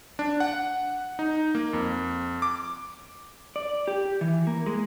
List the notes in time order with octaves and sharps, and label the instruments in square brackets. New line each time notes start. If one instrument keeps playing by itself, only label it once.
[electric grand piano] D4
F#5
D#4
A#3
F2
D6
[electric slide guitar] D5
G4
E3
A#3
G#3